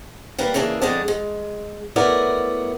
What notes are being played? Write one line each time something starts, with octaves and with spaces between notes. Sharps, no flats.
G3 A#3 A#4 B4
C#3 E3 A#3 D4 G#4
F2 D3 G#3 D4 D#5 A5
G#3
F#3 A3 B3 E4 A#4 D5